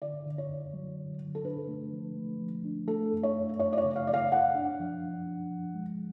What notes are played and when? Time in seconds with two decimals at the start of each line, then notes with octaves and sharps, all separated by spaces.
0.02 D3 D5
0.26 D3
0.38 C#5
0.49 F#2
0.74 F#3
0.97 D3
1.21 D3
1.35 A4
1.45 D4 B4
1.68 A3
1.92 F3
2.17 A3
2.41 F3
2.65 D4
2.88 A3 A4
3.13 F#2
3.23 C#5
3.35 F#2
3.59 F#2 C#5
3.73 D5
3.78 C#5
3.84 C#3
3.96 F5
4.07 F#2 D5
4.13 F5
4.31 F#2 F#5
4.55 D4
4.80 F3
5.03 F3
5.27 D4
5.51 F3
5.74 G#3